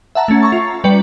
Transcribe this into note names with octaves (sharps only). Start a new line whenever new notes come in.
E5 F#5 A5 A#5
A3 C#4
A#5 C#6 A6
F4
G3 B4 D5 G5 C#7